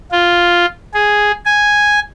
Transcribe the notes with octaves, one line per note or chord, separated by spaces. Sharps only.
F4
G#4
G#5